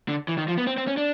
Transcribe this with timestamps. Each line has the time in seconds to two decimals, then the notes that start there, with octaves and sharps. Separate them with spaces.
0.09 D3
0.28 E3
0.38 D#3
0.48 F3
0.58 B3
0.67 C4
0.78 C4
0.87 C#4
0.97 D4